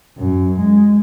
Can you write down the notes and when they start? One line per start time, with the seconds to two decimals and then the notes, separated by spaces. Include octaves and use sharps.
0.18 F#2
0.59 G#3